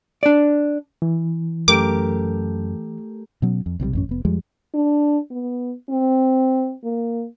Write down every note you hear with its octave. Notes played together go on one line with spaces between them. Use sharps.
D4 D5
E3
F#2 A3 G4 A#4 D6
B2 F#3 C#4
F2
B1 C3 D#3 G3
A1 F#2 C#4
F1 B3
F2 F3 G3 G#3
D4
B3
C4
A#3